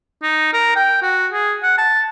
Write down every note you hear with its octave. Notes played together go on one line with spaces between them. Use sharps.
D#4
A#4
G5
F#4
G#4
F#5
A5